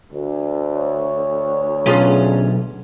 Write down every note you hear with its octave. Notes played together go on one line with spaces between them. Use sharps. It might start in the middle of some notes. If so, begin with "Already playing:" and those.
D2
C#5
B1 C#4 F4 G#4